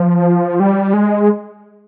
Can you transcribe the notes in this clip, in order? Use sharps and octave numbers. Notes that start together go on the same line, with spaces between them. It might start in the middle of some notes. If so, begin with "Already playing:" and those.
Already playing: F3
G3
G#3